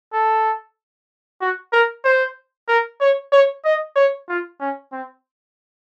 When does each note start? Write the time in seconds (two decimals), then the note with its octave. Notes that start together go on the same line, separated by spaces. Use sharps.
0.13 A4
1.41 F#4
1.73 A#4
2.04 C5
2.68 A#4
3.01 C#5
3.32 C#5
3.65 D#5
3.96 C#5
4.29 F4
4.60 C#4
4.92 C4